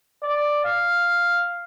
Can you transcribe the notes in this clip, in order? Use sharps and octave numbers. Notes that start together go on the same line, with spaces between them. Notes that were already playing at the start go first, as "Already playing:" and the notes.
D5
F5